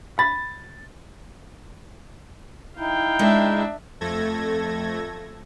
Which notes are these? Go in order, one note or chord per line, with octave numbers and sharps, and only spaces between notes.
B5 A6
D#4 E4 F5 G5
G#3 D4 E5
F2 A3 A4 G#6 A#6